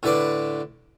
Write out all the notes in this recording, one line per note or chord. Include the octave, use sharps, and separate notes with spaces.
A2 D3 B4 D5